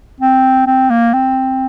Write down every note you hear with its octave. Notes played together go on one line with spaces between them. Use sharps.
C4
C4
A#3
C4